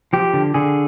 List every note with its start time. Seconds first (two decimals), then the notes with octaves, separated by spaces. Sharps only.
0.13 F3 G4
0.34 D3
0.54 D3 G#4